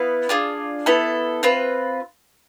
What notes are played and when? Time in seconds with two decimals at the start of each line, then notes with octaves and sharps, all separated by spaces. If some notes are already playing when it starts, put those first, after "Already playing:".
Already playing: B3 E4 B4 F5
0.29 D4 F4 G#4
0.86 B3 E4 A4
1.43 C4 F4 B4